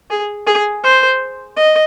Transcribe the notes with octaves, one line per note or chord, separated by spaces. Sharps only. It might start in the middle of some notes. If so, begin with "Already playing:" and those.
G#4
G#4
C5
D#5